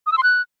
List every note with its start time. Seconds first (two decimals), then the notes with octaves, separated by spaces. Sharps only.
0.06 D#6
0.12 E6
0.18 C6
0.23 F#6